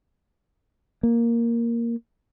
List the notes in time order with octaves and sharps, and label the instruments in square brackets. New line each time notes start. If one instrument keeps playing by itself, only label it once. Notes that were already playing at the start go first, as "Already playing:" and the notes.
[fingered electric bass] A#3